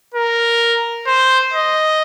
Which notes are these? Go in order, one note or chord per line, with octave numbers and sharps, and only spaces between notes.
A#4
C5
D#5